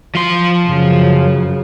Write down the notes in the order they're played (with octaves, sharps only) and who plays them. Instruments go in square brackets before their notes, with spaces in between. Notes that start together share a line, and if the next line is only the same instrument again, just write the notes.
[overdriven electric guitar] F3 C6
[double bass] F#2 C#3